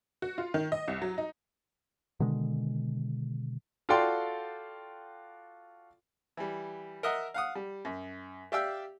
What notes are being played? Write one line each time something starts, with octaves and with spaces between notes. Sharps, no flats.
F#4
F4
D#3
D#5
C2
F#3
D#4
B2 D3 D#3 G#3
F4 F#4 A4 D5 G5 C6
E3 G3
A#4 D#5 E5 F#5
F5 F#5 D#6
G3
F#2
G4 D5 E5 F5 G5 E6